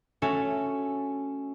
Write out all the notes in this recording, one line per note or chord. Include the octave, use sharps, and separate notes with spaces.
A3 C#4 F#4 A4